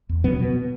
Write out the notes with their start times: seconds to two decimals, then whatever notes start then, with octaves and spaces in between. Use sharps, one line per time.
0.09 E2
0.24 B2 F#3 B3
0.39 B2